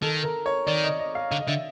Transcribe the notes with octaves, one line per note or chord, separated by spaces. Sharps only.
D#3 A4
A#4
C#5
D#3 D5
D#5
D#5
F5
D3 F5
D#5
D3 E5